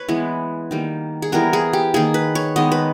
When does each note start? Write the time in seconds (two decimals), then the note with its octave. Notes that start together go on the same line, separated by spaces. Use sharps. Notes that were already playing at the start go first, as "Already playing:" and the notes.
Already playing: B4 C#5
0.09 E3 G#3 B3
0.71 D#3 G3 A#3
1.22 G#4
1.32 E3 G3 B3 A#4
1.53 G#4
1.73 G4
1.94 D#3 A#3 G#4
2.14 B4
2.35 C#5
2.56 D#3 G#3 B3 D#5
2.72 B4